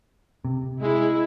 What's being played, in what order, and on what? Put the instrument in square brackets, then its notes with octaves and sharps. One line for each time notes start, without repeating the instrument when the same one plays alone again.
[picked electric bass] C3
[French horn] G#3 [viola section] E4